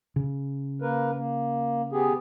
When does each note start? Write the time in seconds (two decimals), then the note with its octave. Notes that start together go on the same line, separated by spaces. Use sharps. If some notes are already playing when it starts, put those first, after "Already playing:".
0.16 C#3
0.82 A#3 A#4 B4
1.16 A#3
1.92 B3 G4 G#4